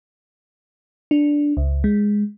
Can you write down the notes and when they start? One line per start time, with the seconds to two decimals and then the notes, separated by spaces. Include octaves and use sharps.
1.11 D4
1.57 C#2
1.84 G#3